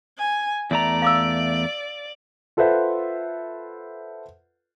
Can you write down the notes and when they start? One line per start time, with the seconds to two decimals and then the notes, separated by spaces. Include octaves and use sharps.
0.17 G#5
0.71 E2 A3 D5 A#5
1.02 F5 D6 E6
2.57 F4 A4 B4 C5 E5 F#5